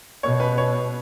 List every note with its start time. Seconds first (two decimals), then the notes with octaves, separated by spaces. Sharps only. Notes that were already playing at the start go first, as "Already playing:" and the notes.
0.23 B2 C#5
0.40 B4
0.58 C#5